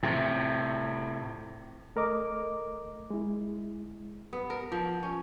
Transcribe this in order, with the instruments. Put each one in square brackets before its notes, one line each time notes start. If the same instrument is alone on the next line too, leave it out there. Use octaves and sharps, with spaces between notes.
[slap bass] A2 C3
[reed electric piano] A3 A#4 D#5 D6
G#3 E4
[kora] B3
A#4
F3
C#4